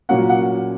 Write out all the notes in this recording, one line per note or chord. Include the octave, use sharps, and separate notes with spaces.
A#2 F#3 A#3 C#4 F#5
F#5